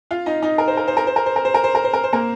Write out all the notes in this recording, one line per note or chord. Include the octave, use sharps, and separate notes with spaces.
F4 F5
D#4 D#5
D#4 D#5
A#4
C5
A#4
C5
A#4
C5
A#4
C5
A#4
C5
A#4
C5
A#4
C5
A#4
C5
A#3 A#4